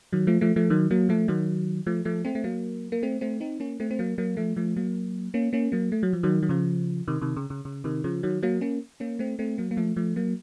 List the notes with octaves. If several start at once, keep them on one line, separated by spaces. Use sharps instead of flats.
D#3 F#3
F3 A3
F3 A3
F3 A3
D#3 F#3
F#3 A#3
F3 A3
D#3 F#3
F3 A3
F3 A3
A3 C4
A3
F#3 A#3
A#3
A3 C4
A3 C4
C4 D#4
A#3 C#4
A3 C4
C4
F#3 A#3
F#3 A#3
F3 A3
F3 A3
F#3 A#3
A#3 C#4
A#3 C#4
F#3 A#3
A3
F#3
F3
D#3 F#3
F#3
C#3 F3
C3 D#3
C3 D#3
C#3
C#3
C#3
C3 D#3
C#3 F3
D#3 F#3
F#3 A#3
A#3 C#4
A#3 C#4
A3 C4
A3 C4
F#3 A#3
A#3
F3 A3
F3 A3
F#3 A#3